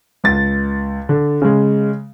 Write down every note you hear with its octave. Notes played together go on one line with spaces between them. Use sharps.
C#2 A6
D3
C#3 G#3